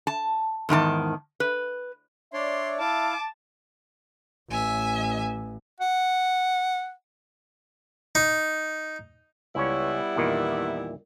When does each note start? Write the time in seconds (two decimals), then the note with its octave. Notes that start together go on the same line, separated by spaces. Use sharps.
0.07 A5
0.69 E2 G#2 D#3 A5
1.40 B4
2.34 D4 C#5 D5 E5 C6
2.79 E4 F5 A5 D6
4.50 A1 E5 G#5
5.80 F#5
8.15 D#4
9.55 C#2 G3 B3 C#4 E4 C#5
10.16 E2 A#2 D#3